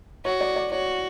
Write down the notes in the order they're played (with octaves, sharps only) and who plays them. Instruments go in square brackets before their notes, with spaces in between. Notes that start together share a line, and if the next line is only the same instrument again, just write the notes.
[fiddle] F#4 [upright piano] C#5
[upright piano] D5
D5
[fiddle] F#4 [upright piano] C#5